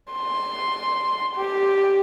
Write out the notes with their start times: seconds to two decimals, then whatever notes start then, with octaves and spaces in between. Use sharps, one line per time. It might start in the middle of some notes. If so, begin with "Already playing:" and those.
0.13 C6
1.35 G4